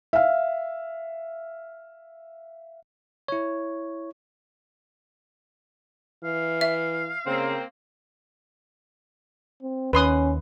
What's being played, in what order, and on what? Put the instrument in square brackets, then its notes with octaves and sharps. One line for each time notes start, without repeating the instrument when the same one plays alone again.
[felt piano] E5 F5
[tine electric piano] E4 C#5
[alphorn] E3 [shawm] F5
[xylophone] E5
[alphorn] C#3 [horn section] A#3 C4
[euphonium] C4
[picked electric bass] D#2 [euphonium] C#4 [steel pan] B4 C6 D#6